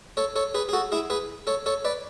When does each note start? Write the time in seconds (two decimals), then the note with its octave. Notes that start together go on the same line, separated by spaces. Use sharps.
0.17 A4 C#5
0.36 A4 C#5
0.54 G#4 B4
0.69 G#4
0.73 F#4 A4
0.92 E4 G#4
1.10 G#4 B4
1.47 A4 C#5
1.66 A4 C#5
1.85 B4 D5